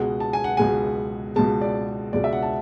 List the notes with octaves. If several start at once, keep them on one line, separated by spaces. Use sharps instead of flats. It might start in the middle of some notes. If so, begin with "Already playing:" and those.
Already playing: C#2 B2 G#3 F#5
A5
G#5
F#5
C#2 B2 G#3 G#5
C#2 B2 G#3 A5
D5
C#2 B2 G#3 D5
E5
F#5
A5